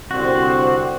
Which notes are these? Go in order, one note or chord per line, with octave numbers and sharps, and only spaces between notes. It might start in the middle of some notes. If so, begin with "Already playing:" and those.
C2 D3 C4 F#4 C5 D5